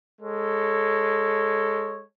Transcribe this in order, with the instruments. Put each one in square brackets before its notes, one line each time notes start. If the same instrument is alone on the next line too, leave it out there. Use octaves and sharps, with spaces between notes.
[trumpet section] G#3 A4 C#5